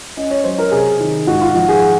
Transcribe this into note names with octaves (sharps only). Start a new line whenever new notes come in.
C#4 D#5
C#5
F#3 C5
A#4
C3 G#4
D#3
G#2 F#4
F4
F3 F#4
G#4